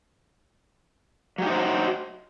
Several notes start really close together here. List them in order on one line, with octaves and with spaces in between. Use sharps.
F#3 G4 D#4 C5 F#4